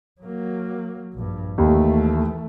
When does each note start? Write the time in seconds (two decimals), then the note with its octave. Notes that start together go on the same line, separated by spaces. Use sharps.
0.22 F#3 A#3
1.14 A#1 G2
1.58 D#2 E3 A3